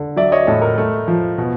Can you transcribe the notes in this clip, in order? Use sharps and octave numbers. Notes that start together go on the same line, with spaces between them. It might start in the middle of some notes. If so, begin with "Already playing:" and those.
Already playing: D3
F#3 D5 E5
C#5 D#5
A2 A4
A#4
A3
F3
B2